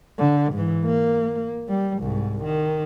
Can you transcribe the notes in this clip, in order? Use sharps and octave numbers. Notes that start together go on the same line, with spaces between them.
D3
G#2 E3
A#3
G3
C2 G#2
D#3